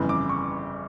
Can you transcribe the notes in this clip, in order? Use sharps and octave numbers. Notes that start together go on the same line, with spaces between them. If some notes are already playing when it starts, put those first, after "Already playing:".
Already playing: G1 F2 C#3 E3
D6
C#6